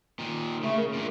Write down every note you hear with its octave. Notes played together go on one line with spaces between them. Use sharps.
A#2 D#3
C#3 A3
A#4
A#2 D3